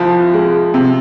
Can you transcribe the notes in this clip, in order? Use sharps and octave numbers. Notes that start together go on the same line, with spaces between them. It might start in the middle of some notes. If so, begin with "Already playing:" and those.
Already playing: C2 F3
G#3
C3